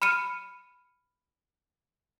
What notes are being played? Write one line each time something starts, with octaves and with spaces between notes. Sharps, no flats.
B5 F6 C#7 D#7